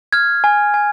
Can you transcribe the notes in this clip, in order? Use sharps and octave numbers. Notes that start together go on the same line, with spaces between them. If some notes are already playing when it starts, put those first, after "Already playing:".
F6 G#6
G#5
G#5